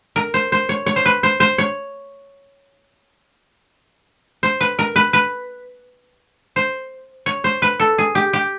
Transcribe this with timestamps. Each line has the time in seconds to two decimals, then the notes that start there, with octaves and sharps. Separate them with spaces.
0.16 A#4
0.34 C5
0.52 C5
0.69 C#5
0.86 C#5
0.96 C5
1.06 B4
1.23 C5
1.40 C5
1.58 C#5
4.43 C5
4.61 B4
4.79 A#4
4.96 B4
5.13 B4
6.56 C5
7.26 C#5
7.44 C5
7.62 B4
7.80 A4
7.98 G#4
8.15 G4
8.33 G4